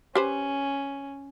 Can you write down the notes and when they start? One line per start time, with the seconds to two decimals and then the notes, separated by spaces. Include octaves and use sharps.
0.15 C#4 G4 B4 C5